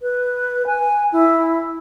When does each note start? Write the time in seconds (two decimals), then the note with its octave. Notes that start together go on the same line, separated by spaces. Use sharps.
0.02 B4
0.67 G#5
1.12 E4